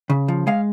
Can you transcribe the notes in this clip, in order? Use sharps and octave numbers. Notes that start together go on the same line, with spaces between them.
C#3
F3
G#3 F5